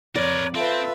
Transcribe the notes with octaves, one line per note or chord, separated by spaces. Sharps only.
F2 A#4 B4 C#5 D5
C4 F4 A4 B4 E5